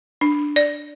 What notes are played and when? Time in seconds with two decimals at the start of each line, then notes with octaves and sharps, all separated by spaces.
0.21 D4
0.56 D5